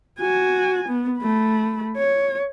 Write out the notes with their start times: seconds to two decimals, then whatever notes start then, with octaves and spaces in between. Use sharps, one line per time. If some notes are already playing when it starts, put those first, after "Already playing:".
0.20 F#4 G#5
0.88 B3
1.19 A3 B5
1.97 C#5